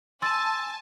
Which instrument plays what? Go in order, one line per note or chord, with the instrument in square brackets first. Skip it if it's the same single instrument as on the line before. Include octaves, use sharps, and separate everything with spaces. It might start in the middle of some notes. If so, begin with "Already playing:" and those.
[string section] G#5 A5 [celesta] C6 E6 A6